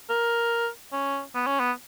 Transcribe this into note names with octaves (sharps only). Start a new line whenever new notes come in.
A#4
C#4
B3
C#4
B3